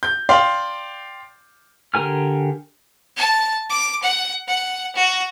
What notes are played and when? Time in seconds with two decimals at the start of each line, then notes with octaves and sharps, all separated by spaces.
0.03 G6
0.29 D5 F5 G5 C6
1.94 D3 G4 A#4 G#5 F6
3.17 A5
3.70 D6
4.02 F#5
4.48 F#5
4.95 F#4